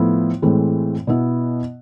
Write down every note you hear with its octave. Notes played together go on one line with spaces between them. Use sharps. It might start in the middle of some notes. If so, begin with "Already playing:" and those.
Already playing: A2 F3 B3 E4
A2 E3 G#3 C4
B2 B3 E4